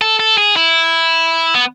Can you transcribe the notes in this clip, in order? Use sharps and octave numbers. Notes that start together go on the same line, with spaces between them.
A4
A4
G#4
E4
B3